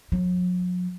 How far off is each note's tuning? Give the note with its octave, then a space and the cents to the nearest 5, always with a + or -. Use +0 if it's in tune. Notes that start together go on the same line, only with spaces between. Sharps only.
F#3 -45